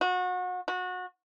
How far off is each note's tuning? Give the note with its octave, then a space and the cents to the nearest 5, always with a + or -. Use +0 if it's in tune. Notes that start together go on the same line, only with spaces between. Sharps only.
F#4 -30
F#4 -25